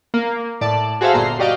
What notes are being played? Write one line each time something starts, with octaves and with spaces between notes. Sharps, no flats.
A#3
A2 D5 A5
F#4 G#4 A4 C5 E5 F5
G1 A#2 A#5 C6 C7
F#4 G4 D5 D#5 F5 G5